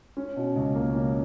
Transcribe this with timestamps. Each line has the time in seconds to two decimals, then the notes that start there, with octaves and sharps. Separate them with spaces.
0.17 C#4
0.36 B2
0.56 C#2
0.75 A#3
0.95 C#4